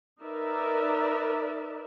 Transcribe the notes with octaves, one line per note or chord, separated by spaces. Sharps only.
D#4 A#4 B4 D5 E5